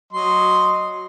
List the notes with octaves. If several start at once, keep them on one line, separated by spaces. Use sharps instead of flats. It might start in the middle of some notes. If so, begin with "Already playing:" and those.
F#3 D#5 C6